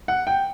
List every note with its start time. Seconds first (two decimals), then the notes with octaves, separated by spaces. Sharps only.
0.08 F#5
0.27 G5